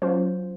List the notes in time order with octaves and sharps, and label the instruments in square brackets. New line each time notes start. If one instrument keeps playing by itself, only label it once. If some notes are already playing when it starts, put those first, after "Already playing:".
[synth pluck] F#3 C#4 F4 C5